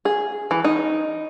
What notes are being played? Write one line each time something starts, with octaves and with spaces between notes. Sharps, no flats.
G#4
E3
D#4